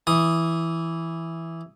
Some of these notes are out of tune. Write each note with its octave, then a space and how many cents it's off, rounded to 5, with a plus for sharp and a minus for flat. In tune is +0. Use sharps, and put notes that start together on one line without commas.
E3 +0 D#6 +0